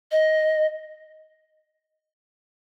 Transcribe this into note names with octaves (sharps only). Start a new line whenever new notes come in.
D#5